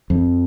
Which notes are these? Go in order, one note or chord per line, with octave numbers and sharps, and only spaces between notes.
F2